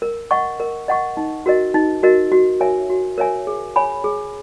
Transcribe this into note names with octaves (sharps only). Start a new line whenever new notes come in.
A#4
D#5 F#5 C#6
A#4
D#5 F#5 C#6
D#4
F#4 A#4 D#5
D#4
F#4 A#4 D#5
F#4
A#4 C#5 E5 G#5
F#4
A#4 C#5 E5 G#5
G#4
C#5 G#5 B5
G#4